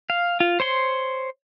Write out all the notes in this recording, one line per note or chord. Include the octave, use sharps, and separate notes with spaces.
F5
F4
C5 C#5 C6